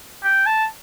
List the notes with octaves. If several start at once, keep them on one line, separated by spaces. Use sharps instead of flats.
G5
A5